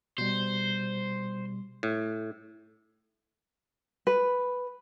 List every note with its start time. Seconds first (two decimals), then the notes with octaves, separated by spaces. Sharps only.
0.18 B2 G3 C5
1.83 A2
4.07 B4